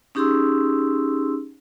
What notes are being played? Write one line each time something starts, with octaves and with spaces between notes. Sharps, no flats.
C#4 D#4 G4 G#4 C6 E6